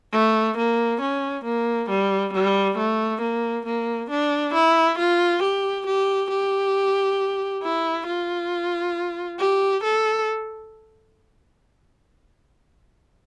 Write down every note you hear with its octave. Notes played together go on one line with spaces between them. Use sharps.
A3
A#3
C#4
A#3
G3
G3
A3
A#3
A#3
D4
E4
F4
G4
G4
G4
E4
F4
G4
A4